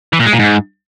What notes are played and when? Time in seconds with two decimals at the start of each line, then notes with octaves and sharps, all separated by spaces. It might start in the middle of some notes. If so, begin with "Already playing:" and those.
0.13 E3
0.19 A#2
0.26 G#3
0.33 A#2
0.39 G#2